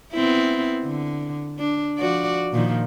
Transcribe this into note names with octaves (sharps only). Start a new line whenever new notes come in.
B3 C4 E4
D3
D4
F3 F#4 D5
A#2 D#3 F3